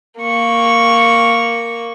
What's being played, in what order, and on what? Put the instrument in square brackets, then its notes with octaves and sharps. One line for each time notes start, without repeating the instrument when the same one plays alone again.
[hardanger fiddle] A#3 C#6